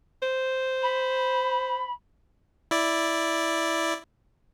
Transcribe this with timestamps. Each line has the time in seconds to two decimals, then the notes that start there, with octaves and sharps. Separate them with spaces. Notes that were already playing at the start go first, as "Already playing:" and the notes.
0.22 C5
0.82 B5
2.71 E4 D5